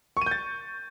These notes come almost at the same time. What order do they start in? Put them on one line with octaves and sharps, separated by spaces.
C#6 D#7 G6 A6